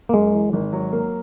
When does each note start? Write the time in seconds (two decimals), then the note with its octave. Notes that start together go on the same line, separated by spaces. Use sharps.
0.09 A#3
0.13 F#2 G#3
0.33 E3
0.53 G#1
0.73 F#3
0.92 A#3